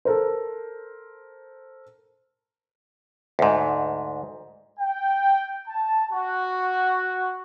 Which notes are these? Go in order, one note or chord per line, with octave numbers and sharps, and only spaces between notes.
A4 A#4 C5
D2 G#2
G5
A5
F#4